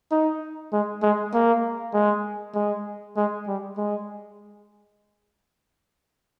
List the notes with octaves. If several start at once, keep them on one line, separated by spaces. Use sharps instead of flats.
D#4
G#3
G#3
A#3
G#3
G#3
G#3
G3
G#3